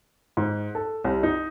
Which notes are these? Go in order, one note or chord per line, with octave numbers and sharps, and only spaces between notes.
G#2
A4
C2
D#4